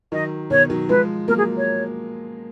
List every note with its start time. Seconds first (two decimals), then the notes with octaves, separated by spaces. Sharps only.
0.12 D#3 F#3 D#5
0.50 B2 D#3 C#5
0.70 D#3 F#3
0.89 F3 G#3 B4
1.28 F#3 A#3 A#4
1.37 G#4
1.57 C#5